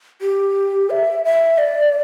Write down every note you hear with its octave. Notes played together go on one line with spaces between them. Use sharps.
G4
E5
E5
D5